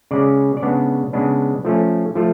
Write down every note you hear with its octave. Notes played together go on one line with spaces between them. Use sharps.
C#3 G#3 C#4 D5
D5
C#3 G#3 B3 D4 C#5
C#3 G#3 B3 D4 B4
F3 A3 C#4
F3 A3